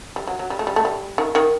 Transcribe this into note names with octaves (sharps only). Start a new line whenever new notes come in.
G3
F#3
F#3
G3
A3
G3
A3
G3
D#3
D#3